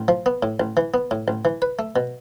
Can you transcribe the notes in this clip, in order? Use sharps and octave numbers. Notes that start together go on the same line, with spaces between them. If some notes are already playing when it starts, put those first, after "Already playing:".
Already playing: A1
F3
B3
A2
A1
E3
B3
A2
A1
E3
B4
A3
B2